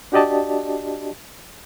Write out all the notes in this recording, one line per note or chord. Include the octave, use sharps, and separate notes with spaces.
D4 F#4 G4 D5 D#5 A5